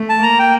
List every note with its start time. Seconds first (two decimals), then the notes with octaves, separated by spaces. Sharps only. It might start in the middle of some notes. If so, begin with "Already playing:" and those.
Already playing: A3
0.09 A5
0.23 A#3 A#5
0.39 G5